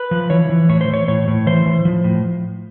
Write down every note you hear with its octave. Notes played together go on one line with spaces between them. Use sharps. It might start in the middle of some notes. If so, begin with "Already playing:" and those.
Already playing: B4
F3
E3 C#5
E3
A2 C#5
C5
E3
C#5
A2 C#5
A2
E3 C5
E3
F3
A2